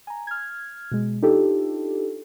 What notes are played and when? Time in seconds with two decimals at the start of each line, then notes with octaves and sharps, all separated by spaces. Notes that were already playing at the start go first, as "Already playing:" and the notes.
0.07 G#5 A#5
0.27 F6 G#6
0.92 B2 G#3
1.22 D4 D#4 F4 G4 A4